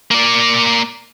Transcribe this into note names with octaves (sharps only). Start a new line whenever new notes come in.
A#3 D5